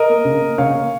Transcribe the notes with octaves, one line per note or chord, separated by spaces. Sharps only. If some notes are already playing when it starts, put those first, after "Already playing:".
Already playing: A#4 D#5
A#3
C#3
A#3
C#3 C#5 F5
A#3